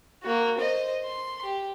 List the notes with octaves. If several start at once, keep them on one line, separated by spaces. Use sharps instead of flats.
A#3 F#4
C5 D#5
C6
G4